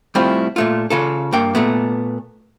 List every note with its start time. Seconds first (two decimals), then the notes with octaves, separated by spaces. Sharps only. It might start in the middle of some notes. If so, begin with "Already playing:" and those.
0.15 G3 A3 C4 E4 F4
0.56 A#2 A3 F4
0.90 C#3 F4 A4
1.32 G2 A#3 G5
1.55 A#2 A3 B3